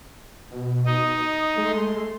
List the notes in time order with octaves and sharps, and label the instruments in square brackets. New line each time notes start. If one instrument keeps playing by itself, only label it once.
[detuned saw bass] B2
[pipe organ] D#4 [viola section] D#5
[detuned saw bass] G#3 [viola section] A3 C6